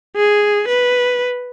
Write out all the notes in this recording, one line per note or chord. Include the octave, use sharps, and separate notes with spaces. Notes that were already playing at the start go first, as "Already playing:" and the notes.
G#4
B4